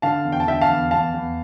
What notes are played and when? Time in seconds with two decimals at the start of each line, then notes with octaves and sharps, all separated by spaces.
0.02 D3 F5 A5
0.25 E2
0.32 G5
0.40 A5
0.47 D3 E5 G5
0.61 F5 A5
0.69 E2
0.91 E2 F5 A5
1.14 E2